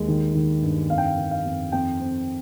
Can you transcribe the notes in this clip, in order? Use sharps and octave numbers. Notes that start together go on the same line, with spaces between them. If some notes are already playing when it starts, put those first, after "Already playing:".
Already playing: D#2 G#3
D#3
D#3
G2
F2 F5
G5
F5
D#3
F5
F2
F2 G5
C4